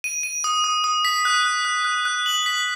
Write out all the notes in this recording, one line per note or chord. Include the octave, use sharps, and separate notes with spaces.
D#7
D#7
D#6
D#6
D#6
B6
F#6
F#6
F#6
F#6
F#6
F#7
B6